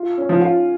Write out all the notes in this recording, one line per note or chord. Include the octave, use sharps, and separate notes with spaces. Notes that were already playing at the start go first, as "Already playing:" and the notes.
Already playing: F4
C#4
F3
F4